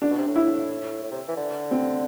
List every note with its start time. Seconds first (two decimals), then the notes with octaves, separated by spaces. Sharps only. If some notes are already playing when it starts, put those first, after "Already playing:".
0.02 D3 D4
0.10 B2
0.18 C3
0.28 A2
0.36 E4
1.03 A2
1.12 C3
1.28 E3
1.37 D3
1.71 C4